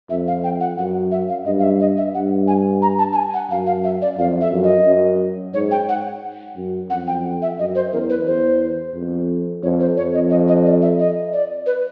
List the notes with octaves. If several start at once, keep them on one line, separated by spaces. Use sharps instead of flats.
F2 E5
F5
G5
F#5
F#2 F#5
E5
F5
G2 D#5
F5
E5
D#5
E5
G2 F#5
G#5
A#5
A5
A5
G#5
F#5
F#2 F5
F5
E5
D5
F2 F5
E5
F#2
D#5
F#2
G#2 C#5
G5
F#5
F#2
F2 F#5
G5
E5
F#2 D#5
C5
E2 A#4
B4
E2 C5
F2
F2 C#5
C5
F2 C#5
D#5
D#5
D#5
D5
E5
D#5
D5
B4